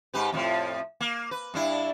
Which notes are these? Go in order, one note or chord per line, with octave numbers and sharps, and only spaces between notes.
G#2 G4 B4
F2 A2 F3
A#3
B4
G2 D4 E4